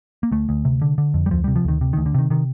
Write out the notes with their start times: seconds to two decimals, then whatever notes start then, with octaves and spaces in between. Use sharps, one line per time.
0.23 A#3
0.31 D2 A3
0.49 D2
0.65 C3
0.82 D3
0.98 D3
1.14 F2
1.26 G3
1.31 D2 F3
1.44 G3
1.48 C3
1.56 F3
1.65 D2 D#3
1.81 C3
1.93 D#3
1.97 D2
2.06 D3
2.14 C3 D#3
2.30 C3 D#3